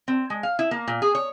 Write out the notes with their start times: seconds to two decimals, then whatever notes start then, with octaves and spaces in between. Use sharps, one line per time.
0.08 C4
0.30 G#3
0.43 F5
0.59 E4
0.71 A#3
0.88 A#2
1.02 G#4
1.15 C#5